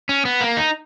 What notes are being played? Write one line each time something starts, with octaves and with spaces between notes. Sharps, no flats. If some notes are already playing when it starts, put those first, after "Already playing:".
C#4
B3
A#3
D#4